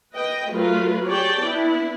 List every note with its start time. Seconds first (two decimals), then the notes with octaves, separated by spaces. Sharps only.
0.15 B4 D#5 G5
0.49 F#3 A3 F4 A#4 B4
1.05 G4 G#4 C#5 D5 G5 A5
1.41 B3 D4 E4